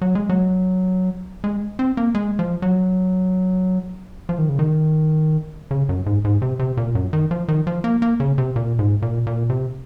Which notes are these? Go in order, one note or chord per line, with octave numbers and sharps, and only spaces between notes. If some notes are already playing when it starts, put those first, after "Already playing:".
F#3
G#3
F#3
G#3
C4
A#3
G#3
F3
F#3
F3
D#3
C#3
D#3
C#3
F#2
G#2
G#2
C3
C3
A#2
F#2
D#3
F3
D#3
F3
A#3
A#3
C#3
C3
A#2
G#2
A#2
A#2
C3